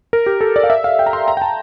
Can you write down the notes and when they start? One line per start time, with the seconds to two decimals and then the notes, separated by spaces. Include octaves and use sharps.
0.13 A#4
0.26 G4
0.41 A4
0.56 D5
0.63 F5
0.70 E5
0.84 F5
0.99 G5
1.06 A#5
1.13 C6
1.28 A#5
1.37 G5
1.42 A5